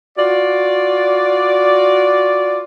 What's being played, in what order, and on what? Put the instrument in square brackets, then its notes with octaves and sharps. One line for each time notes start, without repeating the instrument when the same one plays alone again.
[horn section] F4 F#4 D5